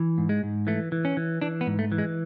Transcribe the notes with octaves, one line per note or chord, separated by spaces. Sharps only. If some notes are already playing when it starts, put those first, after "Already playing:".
Already playing: E3
G#2
G#3
G#2
E3 A3
E3
C#4
E3
E3 D4
B3
G#2
A3
E3
G#3